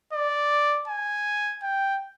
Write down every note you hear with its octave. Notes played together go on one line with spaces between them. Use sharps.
D5
G#5
G5